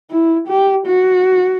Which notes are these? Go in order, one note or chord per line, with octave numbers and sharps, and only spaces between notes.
E4
G4
F#4